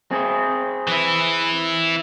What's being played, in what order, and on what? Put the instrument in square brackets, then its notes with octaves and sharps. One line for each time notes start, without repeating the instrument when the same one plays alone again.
[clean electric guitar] C4 G#4
[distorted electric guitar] E3 E4